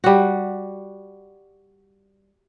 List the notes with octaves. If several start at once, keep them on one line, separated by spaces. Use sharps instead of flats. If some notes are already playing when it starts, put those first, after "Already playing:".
G3 F#4